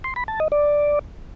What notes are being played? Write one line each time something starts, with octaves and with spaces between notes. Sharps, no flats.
C6
B5
A5
D#5
D5